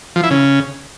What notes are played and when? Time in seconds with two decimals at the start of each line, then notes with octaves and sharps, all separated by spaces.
0.16 F3
0.23 E4
0.31 C#3